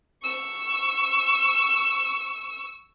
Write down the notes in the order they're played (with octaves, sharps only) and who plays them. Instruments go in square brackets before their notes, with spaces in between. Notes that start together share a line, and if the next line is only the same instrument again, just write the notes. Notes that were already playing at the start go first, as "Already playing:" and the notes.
[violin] C#6 E6